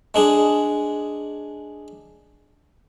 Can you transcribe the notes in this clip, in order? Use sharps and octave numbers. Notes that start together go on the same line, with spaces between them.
G#3 D4 G#4